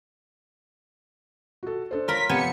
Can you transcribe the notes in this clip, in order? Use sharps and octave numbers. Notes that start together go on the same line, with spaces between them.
F#4 A4
D4 A4 C5
F4 A#4 C#5 B5 B6
C3 F3 B3 G#5 C#7